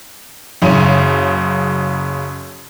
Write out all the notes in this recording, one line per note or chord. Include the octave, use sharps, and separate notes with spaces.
F#1 F#2 C#3 C#5 D#7